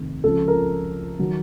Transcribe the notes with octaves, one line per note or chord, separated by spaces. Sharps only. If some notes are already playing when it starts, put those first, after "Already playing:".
Already playing: F1 D#2 D#3
C#2 C#3 F3 A4
A#4
D#3 F#3